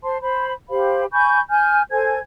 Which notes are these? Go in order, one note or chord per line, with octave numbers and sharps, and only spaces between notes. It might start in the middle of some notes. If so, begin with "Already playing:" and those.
C5 A5 C6
C5 B5
G4 C5 F5 B5
G#5 B5 C#6 G6
G#5 F6 G6
A4 C5 G#5 G#6